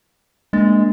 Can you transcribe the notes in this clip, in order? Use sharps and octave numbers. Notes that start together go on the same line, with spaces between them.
G#3 A#3 D4 A6